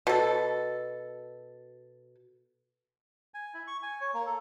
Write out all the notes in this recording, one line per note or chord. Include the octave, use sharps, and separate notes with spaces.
B2 A4
G#5
E4
C#6
G#5
C#5
A#3
A4